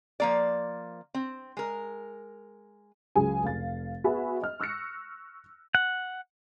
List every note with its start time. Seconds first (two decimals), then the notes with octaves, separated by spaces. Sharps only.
0.20 F3 A#3 D5
1.14 C4
1.57 G#3 A#4
3.15 C#2 F#3 G#4 G#5
3.43 F1 F5 A6
4.04 B3 F#4 G#4 E5 G#5 B5
4.42 D#5 F6
4.60 C#6 E6 F#6 A#6 C#7
5.75 F#5